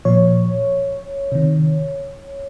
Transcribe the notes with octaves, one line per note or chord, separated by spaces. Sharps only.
A#2 F3 C#5
C3 D#3